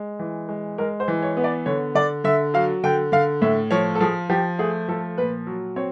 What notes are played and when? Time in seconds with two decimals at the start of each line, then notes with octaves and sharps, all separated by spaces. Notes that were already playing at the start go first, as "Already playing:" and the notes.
Already playing: G#3
0.19 E3
0.49 G#3
0.78 G#3 A#4
1.00 C5
1.08 E3
1.23 C#5
1.37 B3
1.44 D5
1.66 D3 C#5
1.95 D3 D5
2.24 D3 E5
2.54 F#3 F5
2.83 D3 G5
3.12 D3 F5
3.42 A2 E5
3.71 F3 C#5
3.95 A4
4.00 F3 G#4
4.29 F3 G4
4.59 A3 G#4
4.89 F3 A4
5.18 A#2 B4
5.47 F#3
5.76 C4 C#5